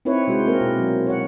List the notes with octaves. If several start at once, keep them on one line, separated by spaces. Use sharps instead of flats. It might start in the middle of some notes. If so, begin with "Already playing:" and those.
C4 D#4 E4 B4 C#5
C3 G#3 F#4 C5
A#3 C4 D4 A#4
B2 G4
F#3
C#5 F#5